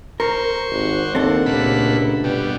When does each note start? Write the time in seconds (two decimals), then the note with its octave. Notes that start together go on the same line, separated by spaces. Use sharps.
0.20 A#4 C5 C#6
0.71 G#1 G4 F#5
1.15 D#2 C4 D4 A4
1.46 C#2 A#2 A3 B5
2.24 G2 B2 G3